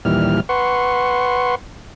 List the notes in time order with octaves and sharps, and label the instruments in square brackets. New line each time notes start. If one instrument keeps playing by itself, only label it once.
[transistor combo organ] D#2 A#2 E3 G3 F6
B4 F#5 C6 C#6